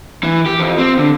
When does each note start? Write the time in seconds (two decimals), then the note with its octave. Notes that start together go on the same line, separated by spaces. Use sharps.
0.23 E3
0.46 G4
0.60 F2
0.78 C4
0.98 D3